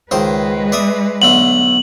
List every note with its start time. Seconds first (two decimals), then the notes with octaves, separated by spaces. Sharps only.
0.11 C#2 D#3 G#3 B4 C5
0.72 D5 E5 D#6
1.22 B1 D3 A3 F#7